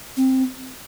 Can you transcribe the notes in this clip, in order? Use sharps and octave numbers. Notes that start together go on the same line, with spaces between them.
C4